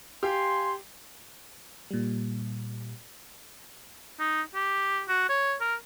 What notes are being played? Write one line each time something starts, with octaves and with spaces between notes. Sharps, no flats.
G4 F5 G#5 C6
A#2 G3
D#4
G4
F#4
C#5
A#4